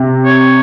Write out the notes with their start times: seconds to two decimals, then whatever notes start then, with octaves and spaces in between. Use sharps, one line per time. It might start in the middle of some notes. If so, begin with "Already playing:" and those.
Already playing: C3
0.25 C#5